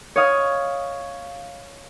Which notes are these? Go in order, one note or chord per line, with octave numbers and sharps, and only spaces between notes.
C#5 D#5 F5 D#6